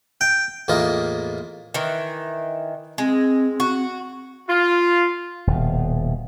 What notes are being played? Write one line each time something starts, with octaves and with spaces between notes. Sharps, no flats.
G5
E2 A2 A#3 F4 D#5
D#3 E3
G#3 C4
F#4
F4
D#1 B2